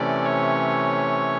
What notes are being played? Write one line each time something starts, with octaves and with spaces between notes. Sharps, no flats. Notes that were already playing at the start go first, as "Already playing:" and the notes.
Already playing: C3 E3 A3 C#4 D5
C#5